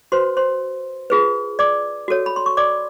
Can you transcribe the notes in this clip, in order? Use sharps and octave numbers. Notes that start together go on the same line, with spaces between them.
F#4 B4 C5 C6
C5 C6
F4 G#4 B4
D5 D6
F#4 A4 C#5
B5
C6
C#6
D5 D6